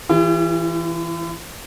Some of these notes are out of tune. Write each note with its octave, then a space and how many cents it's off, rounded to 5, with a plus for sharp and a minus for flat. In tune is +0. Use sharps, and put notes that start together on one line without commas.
E3 +0 E4 +45 G4 +30